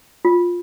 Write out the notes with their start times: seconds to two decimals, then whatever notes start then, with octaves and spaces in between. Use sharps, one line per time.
0.25 F4